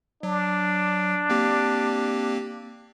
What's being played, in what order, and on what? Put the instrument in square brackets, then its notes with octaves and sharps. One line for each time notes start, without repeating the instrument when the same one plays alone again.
[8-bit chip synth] F#3 [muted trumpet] D4
[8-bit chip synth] A#3 C4 G4